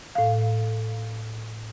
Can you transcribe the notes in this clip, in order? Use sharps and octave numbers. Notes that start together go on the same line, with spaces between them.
A2 F5